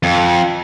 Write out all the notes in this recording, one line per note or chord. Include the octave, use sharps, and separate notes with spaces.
F2